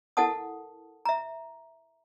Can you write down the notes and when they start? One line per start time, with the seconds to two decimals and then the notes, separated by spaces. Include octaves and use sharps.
0.17 E4 A4 A#4 F#5 A5 D#6
1.05 E5 A#5